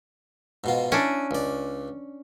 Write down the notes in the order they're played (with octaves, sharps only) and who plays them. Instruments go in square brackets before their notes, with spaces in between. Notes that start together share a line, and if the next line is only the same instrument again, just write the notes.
[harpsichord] G#2 B2 F4
[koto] C#4 D4 [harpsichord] E4
[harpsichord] C#2 D5